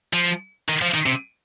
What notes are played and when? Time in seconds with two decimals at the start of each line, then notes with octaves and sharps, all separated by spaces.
0.14 F3
0.69 D#3
0.82 F3
0.94 D#3
1.06 C3